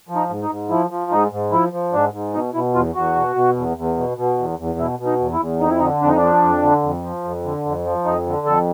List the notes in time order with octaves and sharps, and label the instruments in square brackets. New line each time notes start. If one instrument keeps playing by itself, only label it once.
[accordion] F3
D#4
G#2
D#4
G#2
F3 E4
F3
G#2 D#4
G#2
F3 E4
F3
G#2 D4
G#2
B2 D#4
B2 E4
E2 F4
E2 F#4
B2
B2
E2
E2
B2
B2
E2
E2
B2 E4
B2
D#4
E2
E4
E2
F2 D#4
E4
D3 D#4
F2 D4
D#4
D4
F3
F2
D3
F2
F3
F2
D3
F2
F3
F2 D#4
D3
F2 A4